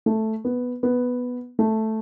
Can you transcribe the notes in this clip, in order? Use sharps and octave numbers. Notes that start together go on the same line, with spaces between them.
A3
B3
B3
A3